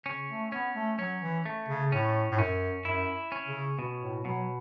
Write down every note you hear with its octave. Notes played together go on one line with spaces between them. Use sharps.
C#3 C#4
A3
B3 C#4
A3
F#3 C#4
E3
A3
C#3
A2 C#4
A2
F#2 C#4
F#2 E4
C#4
C#3
B2
A2
B2 F#3